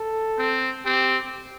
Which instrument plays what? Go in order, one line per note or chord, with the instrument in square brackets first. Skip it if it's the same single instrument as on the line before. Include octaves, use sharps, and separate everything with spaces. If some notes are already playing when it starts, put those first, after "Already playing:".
Already playing: [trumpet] A4
[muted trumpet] C4
[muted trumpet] C4 [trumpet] G4